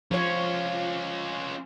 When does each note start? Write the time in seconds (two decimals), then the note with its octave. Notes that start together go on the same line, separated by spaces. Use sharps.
0.11 F3 C#4 F4 C#5